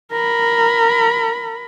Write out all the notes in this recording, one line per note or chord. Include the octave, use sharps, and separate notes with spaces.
A#4 B5